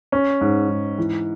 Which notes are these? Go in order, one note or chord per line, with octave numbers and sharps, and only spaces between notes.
C#4
G#2
G#2
E3